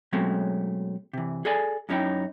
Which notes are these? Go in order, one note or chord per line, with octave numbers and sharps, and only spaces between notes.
B2 F#3 G#3 A3 C4 C#4
C3 E3
G#4 A4 D5 G#5
F#2 F#3 C#4 D#4 E4 G5